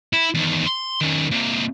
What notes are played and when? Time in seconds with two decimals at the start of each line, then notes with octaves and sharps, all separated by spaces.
0.13 E4
0.34 E2 D#3
0.66 C6
1.01 D#3 C#4
1.31 C3 A#3